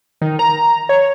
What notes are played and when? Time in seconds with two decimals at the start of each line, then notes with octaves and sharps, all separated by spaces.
0.21 D#3
0.39 A#5
0.89 C#5